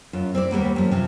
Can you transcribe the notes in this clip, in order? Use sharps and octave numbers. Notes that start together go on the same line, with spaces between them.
F#2 F4
C4 E4 D5
D#2 G3 A#3 B3
F#2 F3
C3 F3